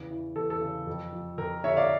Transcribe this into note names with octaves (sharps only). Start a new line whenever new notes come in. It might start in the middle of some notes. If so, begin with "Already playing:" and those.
Already playing: E2 C#3
E3
E2 A4
A4
C#3
F2
F3
F2 A#4
D3 C#5 E5
D5 F5